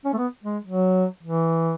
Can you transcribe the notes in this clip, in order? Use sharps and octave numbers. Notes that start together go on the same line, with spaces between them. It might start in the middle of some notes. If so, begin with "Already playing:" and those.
C#4
A3
B3
G#3
F#3
E3